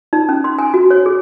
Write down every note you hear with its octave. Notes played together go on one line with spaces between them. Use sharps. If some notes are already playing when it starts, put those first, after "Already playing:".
D#4
C#4
C6
G#5
F#4
C#5
G#4